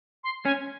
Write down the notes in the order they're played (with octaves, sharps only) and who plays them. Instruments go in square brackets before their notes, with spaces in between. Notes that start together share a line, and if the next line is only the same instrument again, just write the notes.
[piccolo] C6
[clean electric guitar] C#4 [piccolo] G#5